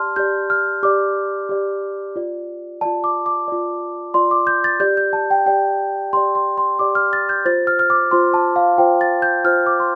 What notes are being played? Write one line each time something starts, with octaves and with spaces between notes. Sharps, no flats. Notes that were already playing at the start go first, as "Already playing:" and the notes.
Already playing: G4 D5 A5 C6 F6
G4 D5 G6
F6
G4 D5 D6
G4 D5
F4 D5
F4 D5 A5
D6
D6
F4 D5
F4 D5 C6
D6
G6
A6
G4 D5 G6
G6
A5
G5
G4 D5 G5
G4 D5 C6
C6
C6
G4 D5 D6
F6
A6
G6
F4 C5 A6
F6
F6
D6
F4 C5 C6
A5
F5
F4 C5 G5
A6
G6
F4 C5 F6
D6
C6